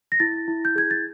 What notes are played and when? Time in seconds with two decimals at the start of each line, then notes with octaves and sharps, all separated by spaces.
0.12 A#6
0.20 E4 A6
0.48 E4
0.65 G6
0.76 G#4 G#6
0.91 A6